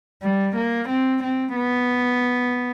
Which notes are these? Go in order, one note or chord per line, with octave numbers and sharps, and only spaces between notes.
G3
A#3
C4
C4
B3